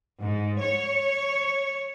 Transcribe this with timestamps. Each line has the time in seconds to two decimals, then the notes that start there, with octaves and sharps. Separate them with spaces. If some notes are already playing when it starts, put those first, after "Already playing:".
0.21 G#2
0.63 C#5